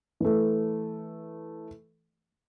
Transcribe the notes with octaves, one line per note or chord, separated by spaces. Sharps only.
E3 A3